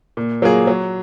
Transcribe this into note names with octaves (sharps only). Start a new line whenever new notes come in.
A#2
F#3 A#3 F4 G#4
F#3